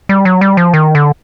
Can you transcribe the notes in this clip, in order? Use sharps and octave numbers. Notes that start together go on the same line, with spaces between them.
G3
F#3
G3
F3
D#3
D3